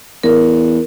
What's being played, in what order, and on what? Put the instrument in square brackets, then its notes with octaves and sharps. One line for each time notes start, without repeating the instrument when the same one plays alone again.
[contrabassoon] E2 [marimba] A#4